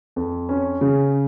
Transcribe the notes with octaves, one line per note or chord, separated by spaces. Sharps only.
F2
C#4
C#3